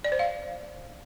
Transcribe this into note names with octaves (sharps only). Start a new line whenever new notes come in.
D5
C5
F5